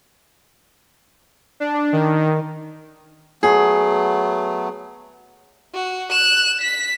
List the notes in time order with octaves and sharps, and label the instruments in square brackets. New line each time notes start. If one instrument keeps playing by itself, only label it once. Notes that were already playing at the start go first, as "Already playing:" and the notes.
[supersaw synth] D4
D#3
[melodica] F#3 A3 B3 [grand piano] G#4
[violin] F#4
F#6 E7
B6